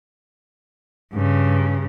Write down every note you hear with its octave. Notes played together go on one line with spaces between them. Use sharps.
G2 C#3